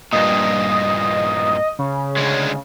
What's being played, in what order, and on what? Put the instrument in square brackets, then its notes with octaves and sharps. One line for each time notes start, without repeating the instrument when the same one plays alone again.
[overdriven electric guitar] G2 A#2 [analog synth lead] D#5
[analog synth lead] C#3
[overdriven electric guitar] D2 G#3